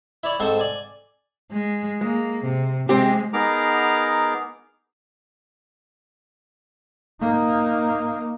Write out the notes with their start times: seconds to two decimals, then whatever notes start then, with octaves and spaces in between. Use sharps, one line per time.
0.24 E4 C#5 D5
0.40 G#2 C4 A4 C5 C#6
0.59 D5 G#5
1.51 G#3
2.01 G#3 A#3
2.44 C3
2.89 G#3 C4 G4
3.33 B3 D#4 G#4 A#4 A#5 D6
7.21 A#3 D#4